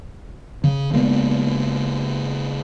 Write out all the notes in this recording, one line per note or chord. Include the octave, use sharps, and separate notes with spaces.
C#3
C#3 G#3 A#3 B3